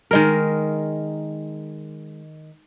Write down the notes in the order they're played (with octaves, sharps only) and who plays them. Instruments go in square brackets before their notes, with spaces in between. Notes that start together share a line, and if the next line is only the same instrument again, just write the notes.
[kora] D#3 G#3 A#4